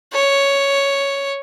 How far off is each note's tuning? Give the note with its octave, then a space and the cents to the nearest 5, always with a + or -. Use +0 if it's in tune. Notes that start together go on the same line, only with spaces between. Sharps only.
C#5 +5